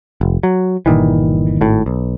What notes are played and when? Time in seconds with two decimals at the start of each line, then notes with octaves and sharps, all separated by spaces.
0.21 F1
0.43 F#3
0.86 G1 A#2 D#3 E3
1.61 G#1 A2
1.86 B1